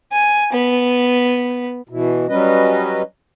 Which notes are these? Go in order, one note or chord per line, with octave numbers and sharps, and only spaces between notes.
G#5
B3
B2 E3
F#3 G3 C#4 B4 D#5